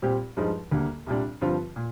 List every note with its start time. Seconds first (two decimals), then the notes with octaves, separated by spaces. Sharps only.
0.02 A#2 G3 C4 G4
0.37 G2 F3 G#3 D#4
0.71 D2 D3 G3 A#3
1.07 C2 A#2 G3 D4
1.41 G2 D3 F3 C4 F4
1.76 A#2